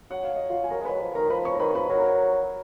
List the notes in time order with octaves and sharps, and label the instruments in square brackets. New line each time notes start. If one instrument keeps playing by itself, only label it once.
[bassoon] F#3 [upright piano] F#5
[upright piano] F5
D#5
F4 F5
G#5
[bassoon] F#3 [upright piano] A#4 A#5
[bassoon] G#3
[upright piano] B4 B5
[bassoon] F#3
F3
[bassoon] D#3 [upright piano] A#4 A#5
[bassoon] F3 [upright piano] B4 B5
[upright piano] C#5 C#6
A#5
[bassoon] D#3 [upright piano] B4 B5
[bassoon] F3 [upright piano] B4 B5
[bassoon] F#3 [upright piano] A#4 A#5
[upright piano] A#4 A#5